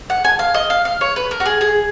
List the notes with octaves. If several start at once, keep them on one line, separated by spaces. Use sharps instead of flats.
F#5
G#5
F5
D#5
F5
F5
C#5
B4
A#4
F#4
G#4
G#4